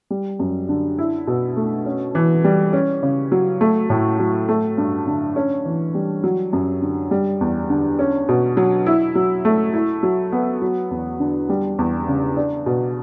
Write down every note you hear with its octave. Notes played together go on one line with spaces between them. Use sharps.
G3
F#2
D3
E4
B2
A3
C#4
E3
G3
C#4
C#3
F#3
A3
A2
F#3
A3
G2
D3
C#4
E3
G3
F#3
F#2
D3
G3
E2
D3
C#4
B2
F#3
E4
F#3
A3
E4
F#3
B3
F#3
E2
D3
G3
E2
C#3
D4
B2